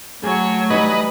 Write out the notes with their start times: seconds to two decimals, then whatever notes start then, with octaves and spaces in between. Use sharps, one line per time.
0.23 F#3 A3 G#4 C#5
0.70 E3 G3 D#4 B4 D#5